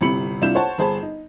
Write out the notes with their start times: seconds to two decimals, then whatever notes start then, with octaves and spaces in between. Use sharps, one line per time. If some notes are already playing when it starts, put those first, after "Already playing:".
0.01 G1 C3 E4 B5 C#7 F#7
0.42 C2 D4 E4 F4 G6 E7
0.55 C5 C#5 F#5 A5
0.78 G1 G#4 C5 A5 B5
1.02 D#4